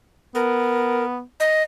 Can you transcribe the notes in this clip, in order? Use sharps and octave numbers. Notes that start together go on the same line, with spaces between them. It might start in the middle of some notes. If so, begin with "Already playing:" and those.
B3 A#4
D#5